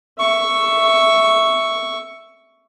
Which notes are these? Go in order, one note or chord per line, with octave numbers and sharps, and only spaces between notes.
E5 C#6